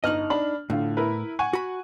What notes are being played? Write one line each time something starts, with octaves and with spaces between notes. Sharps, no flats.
G1 D#4 D#5 F6 F#7
D4 B5 F#7
A2 D3 F4
E4 A#4 B4
F#5 G#5 C#6
F#4 B5